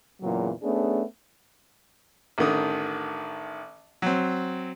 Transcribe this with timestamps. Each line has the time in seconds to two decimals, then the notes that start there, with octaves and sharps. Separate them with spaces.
0.21 E2 A#2 C#3 F#3
0.63 A3 B3 C#4 D4 G#4
2.38 A1 D3 D#3 D#6
4.02 F#3 C4